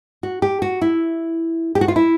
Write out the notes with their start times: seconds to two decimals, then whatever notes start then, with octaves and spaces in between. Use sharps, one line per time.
0.23 F#4
0.42 G4
0.62 F#4
0.81 E4
1.75 G4
1.81 F#4
1.88 F4
1.96 E4